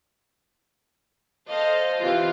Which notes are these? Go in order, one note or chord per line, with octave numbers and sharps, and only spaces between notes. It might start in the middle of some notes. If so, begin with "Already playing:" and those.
A4 C5 D#5 F5
C3 E3 F4